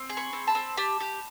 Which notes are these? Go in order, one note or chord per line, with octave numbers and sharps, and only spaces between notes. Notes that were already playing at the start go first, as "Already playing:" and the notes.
Already playing: C4
G#4
B5 C#6
C4
A5 B5
C4
G4 A5 B5
G4